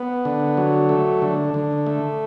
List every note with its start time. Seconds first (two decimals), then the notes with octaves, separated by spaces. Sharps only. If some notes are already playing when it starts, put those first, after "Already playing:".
Already playing: B3
0.25 D3
0.57 F#3
0.89 A3
1.22 D3
1.54 D3
1.87 A3